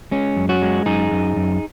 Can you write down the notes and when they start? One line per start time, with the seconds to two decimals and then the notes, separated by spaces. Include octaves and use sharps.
0.11 G#3 C#4
0.37 F#2
0.49 C#4 F#4
0.62 G#3
0.86 F#2 D#4 G#4
1.12 F#2
1.36 F#2